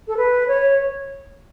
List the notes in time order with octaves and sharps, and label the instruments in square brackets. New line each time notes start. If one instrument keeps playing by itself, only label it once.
[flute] A4
B4
C#5